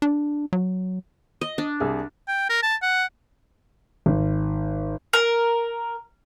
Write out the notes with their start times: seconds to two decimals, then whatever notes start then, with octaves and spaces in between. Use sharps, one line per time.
0.02 D4
0.53 F#3
1.41 D#5
1.58 D4
1.80 C2 G#4
2.28 G5
2.49 A#4
2.62 A5
2.82 F#5
4.06 G#1
5.13 A#4